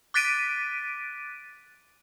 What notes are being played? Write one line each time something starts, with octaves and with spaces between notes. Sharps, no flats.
D6 F#6 A6 B6 D7 D#7